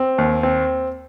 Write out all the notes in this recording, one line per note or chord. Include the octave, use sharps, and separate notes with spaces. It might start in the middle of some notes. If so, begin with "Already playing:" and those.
Already playing: C4
D#2
C4